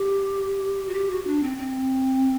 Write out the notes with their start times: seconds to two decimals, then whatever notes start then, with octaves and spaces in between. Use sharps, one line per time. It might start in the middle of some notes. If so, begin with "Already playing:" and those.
Already playing: G4
0.89 F#4
0.94 G4
1.11 F#4
1.27 D4
1.43 C4
1.58 C4